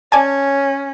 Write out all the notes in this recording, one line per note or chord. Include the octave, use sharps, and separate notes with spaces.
C#4 D5 G#5 A5